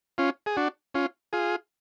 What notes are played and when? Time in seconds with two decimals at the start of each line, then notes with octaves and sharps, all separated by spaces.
0.18 C#4 F4
0.46 G#4
0.57 D4 F#4
0.95 C#4 F4
1.33 F4 G#4